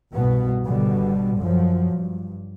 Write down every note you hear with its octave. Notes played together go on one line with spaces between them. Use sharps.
C2 G2 B2 B3
G#1 B2 D3 G3
F#2 F3 F#3
G2